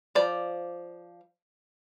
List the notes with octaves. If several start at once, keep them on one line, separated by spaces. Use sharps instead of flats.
F3 D5